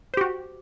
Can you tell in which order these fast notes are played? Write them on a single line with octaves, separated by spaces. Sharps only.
C5 G4 F#4